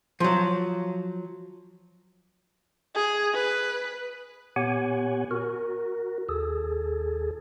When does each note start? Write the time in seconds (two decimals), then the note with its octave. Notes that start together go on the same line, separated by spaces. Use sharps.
0.20 F3 F#3
2.95 G#4
3.34 B4
4.56 A#2 B3 G4 C#5 F#5 G#5
5.31 F#4 A#4
6.29 D#2 G#4 A4